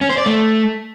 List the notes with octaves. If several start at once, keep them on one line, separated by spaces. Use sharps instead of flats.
C#4
C5
D5
A3